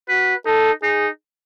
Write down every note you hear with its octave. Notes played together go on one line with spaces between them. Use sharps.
F#4 B4
D#4 A4
D#4 G#4